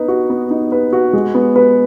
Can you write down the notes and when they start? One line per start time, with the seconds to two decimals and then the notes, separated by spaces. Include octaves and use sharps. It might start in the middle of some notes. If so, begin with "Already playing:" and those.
Already playing: B3 D#4 B4
0.08 F#4
0.30 B3
0.50 D#4
0.72 B4
0.93 F#4
1.13 G#3
1.34 B3
1.56 B4